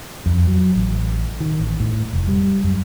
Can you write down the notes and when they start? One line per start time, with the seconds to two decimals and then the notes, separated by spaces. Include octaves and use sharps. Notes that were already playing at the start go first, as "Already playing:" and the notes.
0.26 F2
0.47 F#3
0.76 A1
1.40 D#3
1.60 A1
1.80 A2
2.13 F1
2.27 G3
2.64 F#2